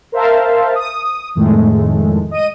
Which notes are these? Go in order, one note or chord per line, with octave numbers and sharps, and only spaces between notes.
A#4 C5 E5 F5 A5
D#6
F2 A2 D#3 G#3 A3
D#5 D#7